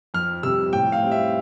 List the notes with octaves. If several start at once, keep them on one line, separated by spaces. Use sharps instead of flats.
F2 F6
C3 G3 E6
A2 G5
F5
G3 C4
E5